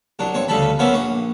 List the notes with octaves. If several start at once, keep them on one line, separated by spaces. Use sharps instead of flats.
C2 F#3 D4
G2 C4 C#5
D2 C#3 G3 A4 A5 B5
F#3 A#3 B3 C#4 C5 E5
A#1 F#4 D#6